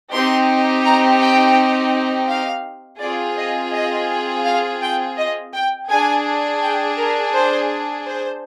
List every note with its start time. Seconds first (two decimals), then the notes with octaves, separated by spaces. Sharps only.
0.12 C4 D#4 G4 C6
0.84 A#5
1.20 G5
2.29 F5
3.00 C4 F4 G#4 D5
3.36 D#5
3.72 D#5
4.45 F5
4.81 G5
5.17 D#5
5.53 G5
5.90 D4 G#4 G#5
6.61 G5
6.97 A#4
7.33 C5
8.06 C5